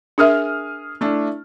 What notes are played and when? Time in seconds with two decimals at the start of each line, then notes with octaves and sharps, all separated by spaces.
0.18 D4 G#4 A#4 E5 D#6 F6
1.01 A3 D4 E4